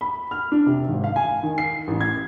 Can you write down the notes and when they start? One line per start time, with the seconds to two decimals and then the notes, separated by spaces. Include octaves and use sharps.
0.01 B5
0.31 F6
0.52 D4
0.66 C3
0.88 G#1
1.04 F5
1.16 G#5
1.43 D#3
1.58 C7
1.88 A1
2.01 G#6